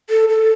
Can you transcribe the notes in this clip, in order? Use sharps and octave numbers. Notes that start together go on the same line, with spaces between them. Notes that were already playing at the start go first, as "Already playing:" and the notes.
A4
A4